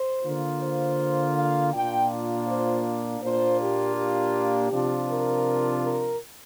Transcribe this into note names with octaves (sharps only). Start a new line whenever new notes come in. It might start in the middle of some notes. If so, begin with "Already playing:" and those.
Already playing: C5
D3 A#3 F4
C5
F5
A#2 A#3 D4 F4 G5
C5
A#2 A#3 D4 F4 C5
G4
G4
C3 F3 D4 F4
A#4
A#4